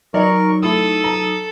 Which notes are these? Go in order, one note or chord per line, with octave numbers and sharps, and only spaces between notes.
F#3 D#4 A#4 D5 C#6
A3 E4 A4 D#6 E6
A5 A#5